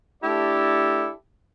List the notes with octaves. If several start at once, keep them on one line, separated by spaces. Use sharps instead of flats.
A3 D4 E4 G4 A4 D5